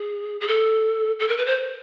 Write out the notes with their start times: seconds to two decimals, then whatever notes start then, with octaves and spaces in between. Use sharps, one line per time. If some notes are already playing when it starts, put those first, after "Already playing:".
Already playing: G#4
0.41 G#4
0.48 A4
1.20 A4
1.28 A#4
1.37 B4
1.46 C5